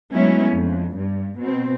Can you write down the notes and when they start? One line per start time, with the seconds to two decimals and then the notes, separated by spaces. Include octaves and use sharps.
0.13 F#3 G#3 A3 B3 C#4 E4
0.52 F2
0.97 G2
1.39 B2 C4